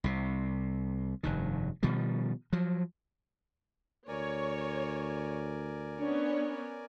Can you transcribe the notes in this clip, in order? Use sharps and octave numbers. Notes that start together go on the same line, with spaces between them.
C2 C3
F1 G2 D#3
B2 D#3 F3 G3
F3 F#3
D2 A#4 C#5 D5 G#5
B3 C#4 D4 C#5